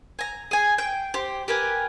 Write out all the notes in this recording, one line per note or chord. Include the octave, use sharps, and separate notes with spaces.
G#5 A#5
G#4 G#5
G5
G4 C5
G4 A#4 B4 G#5